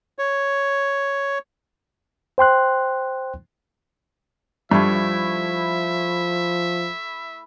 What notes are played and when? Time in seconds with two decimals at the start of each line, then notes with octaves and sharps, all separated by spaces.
0.19 C#5
2.38 C5 G5 C6 F#6
4.71 G2 F3 A3 E4 E5